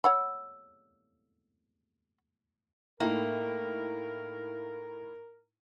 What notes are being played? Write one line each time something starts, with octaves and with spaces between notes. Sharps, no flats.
C#5 F#5 B5 E6
A2 A#3 D#4 E4 A4 A#4 G5 A#5